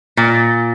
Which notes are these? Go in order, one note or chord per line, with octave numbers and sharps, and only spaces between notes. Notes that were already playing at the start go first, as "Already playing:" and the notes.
A#2